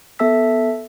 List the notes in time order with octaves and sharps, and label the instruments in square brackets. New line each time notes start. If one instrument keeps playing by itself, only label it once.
[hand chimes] B3 A4 E5 A5 E6 B6